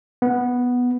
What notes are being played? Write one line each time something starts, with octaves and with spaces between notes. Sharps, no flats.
B3